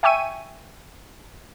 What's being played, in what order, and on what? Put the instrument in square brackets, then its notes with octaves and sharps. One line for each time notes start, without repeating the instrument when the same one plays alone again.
[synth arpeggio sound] E5 G5 G#5 C#6 E6 D#7